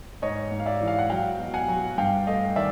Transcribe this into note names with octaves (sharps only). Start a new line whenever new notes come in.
G#2 C#5 D#5
G#2
F5
D5 E5
E3
F5
F#5
F#3 F5 G5
B2
F#5 G#5
F#3
G2 F5 G5
A3 D#5 F5
D#3 D5 E5